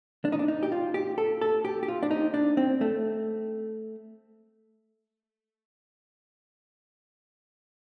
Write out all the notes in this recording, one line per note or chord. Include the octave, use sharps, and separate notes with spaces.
D4
D#4
D4
D#4
G4
F4
G4
A4
A4
G4
G4
F4
D4
D#4
D4
C4
A3